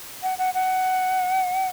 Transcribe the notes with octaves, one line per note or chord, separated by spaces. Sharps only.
F#5
F#5
F#5